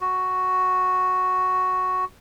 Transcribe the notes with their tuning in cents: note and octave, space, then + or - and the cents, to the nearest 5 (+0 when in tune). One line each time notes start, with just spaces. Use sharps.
F#4 +0